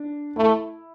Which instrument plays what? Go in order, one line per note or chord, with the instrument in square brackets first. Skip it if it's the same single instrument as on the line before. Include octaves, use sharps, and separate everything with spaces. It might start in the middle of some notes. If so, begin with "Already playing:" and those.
Already playing: [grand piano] D4
[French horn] A3 [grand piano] E4